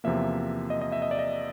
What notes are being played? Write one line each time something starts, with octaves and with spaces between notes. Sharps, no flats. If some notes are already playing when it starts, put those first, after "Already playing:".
E2 C3 F3 A#3 E5
D#5
D#5
E5
D#5
D5
D#5